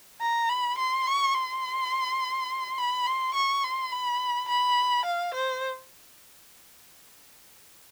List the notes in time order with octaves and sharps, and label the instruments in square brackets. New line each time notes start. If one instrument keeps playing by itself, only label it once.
[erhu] A#5
B5
C6
C#6
C6
B5
C6
C#6
C6
B5
B5
F5
C5